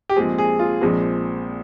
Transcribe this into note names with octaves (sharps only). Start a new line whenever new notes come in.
G4
A#1 A#2 G#3 C4 G#4
G#4
F4
A#1 A#2 F3 G#3 C4